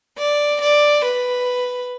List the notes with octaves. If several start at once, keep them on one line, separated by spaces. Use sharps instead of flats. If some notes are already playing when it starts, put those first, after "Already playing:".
D5
D5
B4